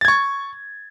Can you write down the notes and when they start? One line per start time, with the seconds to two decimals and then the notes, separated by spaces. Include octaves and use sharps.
0.01 A6
0.05 G#6
0.08 C#6